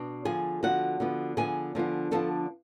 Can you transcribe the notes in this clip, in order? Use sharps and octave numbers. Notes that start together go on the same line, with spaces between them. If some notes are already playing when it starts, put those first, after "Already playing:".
Already playing: B2 D4
D3 F3 B3 G#4 G#5
D3 F3 B3 F#4 F#5
D3 F3 B3
D3 F3 B3 G#4 G#5
D3 F3 B3 D4
D3 F3 B3 D4 A4 A5